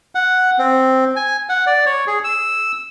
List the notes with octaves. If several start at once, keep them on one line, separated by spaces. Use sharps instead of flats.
F#5
C4
G#5
F#5
D5
C#5
G#4
E6